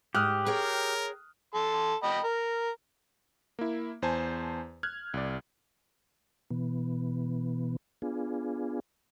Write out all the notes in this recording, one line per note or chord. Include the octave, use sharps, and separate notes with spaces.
G#2 G4 D#6 F6 F#6
G#4 A#4 C#5 G5
A4 C6
D#5 G5 B5
A#4
A#3 E4
E2 C5 G#5 A5
F6 F#6 G#6
C2 D5
B2 E3 B3
B3 D4 F4 G#4